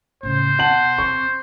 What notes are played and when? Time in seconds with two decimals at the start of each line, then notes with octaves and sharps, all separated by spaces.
0.23 A2 C#3 C5
0.59 B2 F#5 A5 F#7
0.98 E3 C4 C#6